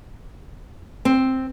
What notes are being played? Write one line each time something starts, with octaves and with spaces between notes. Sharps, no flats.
C4